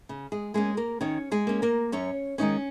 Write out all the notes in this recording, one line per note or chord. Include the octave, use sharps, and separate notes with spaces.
C#3
G#3 G#4
G#3 A#3 C#4 G#4
A#3 A#4
D#3 C#4 C#5
G#3 G#4
A#3 C#4
A#3 A#4
F#2 C#4 C#5
D#3 G#3 C#4 D#4 C#5